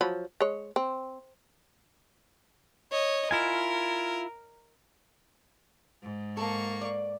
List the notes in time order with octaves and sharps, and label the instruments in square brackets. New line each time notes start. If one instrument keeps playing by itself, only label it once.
[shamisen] F3 F#3 B5
G#3 C#5
C4
[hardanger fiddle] C#5 D#5
[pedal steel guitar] E4 F4 G#5 [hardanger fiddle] A#4
[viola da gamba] G#2
[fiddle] A#3 C#6 [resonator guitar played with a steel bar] A4
[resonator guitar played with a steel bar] D5